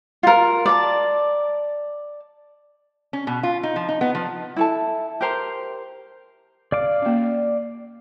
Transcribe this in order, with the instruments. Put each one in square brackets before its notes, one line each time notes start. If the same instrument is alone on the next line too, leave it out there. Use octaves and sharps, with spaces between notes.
[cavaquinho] F4 A#4
D5 A5
[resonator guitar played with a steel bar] C#4
B2
F4
D#4
F3
D#4
B3
F3
[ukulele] E4 A4 A5
G4 A#4 C5 A#5
[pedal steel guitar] D5 F5 D6
[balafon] A#3 C#4